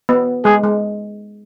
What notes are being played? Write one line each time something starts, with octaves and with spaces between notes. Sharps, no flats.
B3
G#3 G#4
G#3